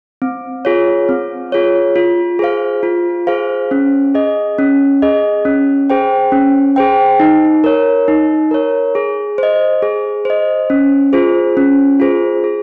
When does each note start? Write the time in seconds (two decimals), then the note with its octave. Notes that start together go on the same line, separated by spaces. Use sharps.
0.22 C4
0.65 F4 G#4 C#5
1.09 C4
1.52 F4 G#4 C#5
1.96 F4
2.39 G#4 C5 F5
2.83 F4
3.27 G#4 C5 F5
3.71 C#4
4.15 G#4 D#5
4.59 C#4
5.02 G#4 D#5
5.45 C#4
5.90 G#4 C5 G5
6.32 C#4
6.76 G#4 C5 G5
7.20 D#4
7.64 A#4 C#5
8.08 D#4
8.51 A#4 C#5
8.95 G#4
9.38 C5 D#5
9.83 G#4
10.25 C5 D#5
10.70 C#4
11.13 F4 G#4 C5
11.57 C#4
12.00 F4 G#4 C5
12.44 G#4